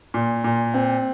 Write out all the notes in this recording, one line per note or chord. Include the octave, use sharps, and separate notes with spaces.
A#2
A#2
C4